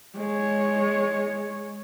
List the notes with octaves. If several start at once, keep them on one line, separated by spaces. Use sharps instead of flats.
G#3 C#5